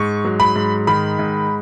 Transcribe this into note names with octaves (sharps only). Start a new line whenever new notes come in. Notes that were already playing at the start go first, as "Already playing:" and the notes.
Already playing: G#2 C#6
F#3
B5
G#2
D#3 B5
G#2